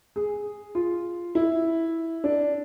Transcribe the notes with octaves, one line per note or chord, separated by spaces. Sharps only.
G#4
F4
E4
D4